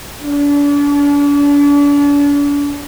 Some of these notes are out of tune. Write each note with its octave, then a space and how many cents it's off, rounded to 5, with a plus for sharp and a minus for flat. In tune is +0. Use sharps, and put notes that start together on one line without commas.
D4 -40